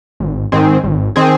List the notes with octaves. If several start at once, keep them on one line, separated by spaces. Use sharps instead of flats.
G#1
G#2 D#3 C4 G#4
G#1
D#3 C4 G#4